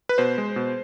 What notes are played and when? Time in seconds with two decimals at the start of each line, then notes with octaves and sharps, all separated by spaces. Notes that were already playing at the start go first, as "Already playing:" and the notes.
0.09 B4
0.18 B2 C5
0.38 G#3
0.56 B2